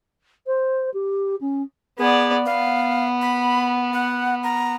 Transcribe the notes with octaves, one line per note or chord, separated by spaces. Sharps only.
C5
G4
C#4
B3 G#4 D5
B3 F5
B5
F#5
A#5